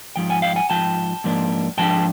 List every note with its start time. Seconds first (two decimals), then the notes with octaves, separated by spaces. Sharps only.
0.16 G#2 F3 G5
0.30 F#5 G#5
0.42 F5 G5
0.56 F#5 G#5
0.70 G#2 F3 G5 A5
1.24 G#2 F3 A#3 D4
1.77 G#2 F3 D4 G5 A5